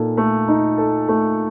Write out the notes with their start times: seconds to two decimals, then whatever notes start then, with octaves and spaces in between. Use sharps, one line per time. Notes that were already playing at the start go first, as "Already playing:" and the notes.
Already playing: A#2 D#4 A4
0.17 A3
0.48 D#4
0.78 A4
1.08 A3